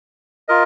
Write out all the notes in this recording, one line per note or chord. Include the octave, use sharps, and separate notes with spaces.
F4 A#4 D#5